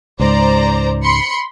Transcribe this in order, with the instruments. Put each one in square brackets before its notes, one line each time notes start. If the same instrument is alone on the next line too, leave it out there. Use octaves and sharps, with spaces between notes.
[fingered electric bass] C#2 G#2 [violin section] C5 D5 A#5
[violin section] B5 C6 C#7